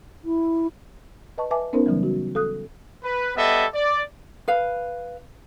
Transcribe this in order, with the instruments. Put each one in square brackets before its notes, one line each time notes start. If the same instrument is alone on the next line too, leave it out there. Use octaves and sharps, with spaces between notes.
[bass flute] E4
[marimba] B4 D#5 A5 C#6
B4 E5 G#5 A5 D6
B3 C#4 D#4 A#4 C5
C#3 E3 F#3 G3
F#4
A4 F5 D#6 F#6
[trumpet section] B4
G3 B3 A4 D#5 E5
D5
[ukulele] B4 F5